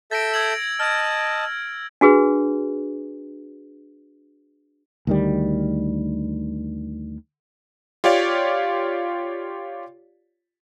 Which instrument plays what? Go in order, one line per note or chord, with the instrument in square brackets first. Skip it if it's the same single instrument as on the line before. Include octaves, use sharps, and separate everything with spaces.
[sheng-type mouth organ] A4 E5 G6 [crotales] A6 A#6 D7
[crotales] E6 G#6 F#7
[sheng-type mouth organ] D#5 A5 [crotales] F6 G#6
[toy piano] D4 F#4 G#4 B4
[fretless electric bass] D2 D#3 G3
[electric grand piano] F4 G4 C#5 D5 F5